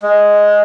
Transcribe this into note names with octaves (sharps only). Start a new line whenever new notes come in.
G#3